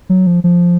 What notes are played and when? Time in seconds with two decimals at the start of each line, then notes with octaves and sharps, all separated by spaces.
0.10 F#3
0.27 F3
0.44 F3